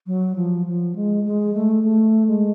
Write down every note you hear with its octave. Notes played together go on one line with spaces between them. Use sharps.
F#3
F3
F3
G#3
G#3
A3
A3
G#3